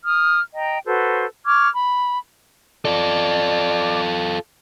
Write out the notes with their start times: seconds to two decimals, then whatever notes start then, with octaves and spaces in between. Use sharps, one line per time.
0.04 D#6 F6
0.53 D#5 G5 A#5
0.85 F#4 A4 B4 C5
1.46 C#6 D6 F6 G#6
1.75 B5
2.85 F4 A4 D5